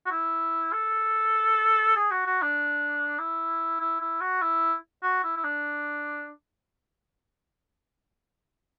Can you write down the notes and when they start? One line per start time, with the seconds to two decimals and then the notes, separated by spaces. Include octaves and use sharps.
0.06 F#4
0.11 E4
0.72 A4
1.96 G#4
2.11 F#4
2.26 F#4
2.42 D4
3.18 E4
3.80 E4
4.01 E4
4.21 F#4
4.42 E4
5.03 F#4
5.23 E4
5.36 E4
5.44 D4